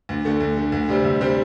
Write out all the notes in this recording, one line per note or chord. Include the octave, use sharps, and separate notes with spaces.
D2
D3 A3
D2
D3 A3
D2
C3 G3 C4
D2
C3 G3 C4